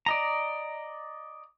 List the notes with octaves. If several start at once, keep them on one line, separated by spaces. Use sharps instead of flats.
D5 D#5 A#5